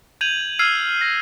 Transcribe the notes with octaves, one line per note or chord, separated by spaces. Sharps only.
G6 G#6 D#7 F7 F#7
E6 F6 G#6 C7 D#7
A#6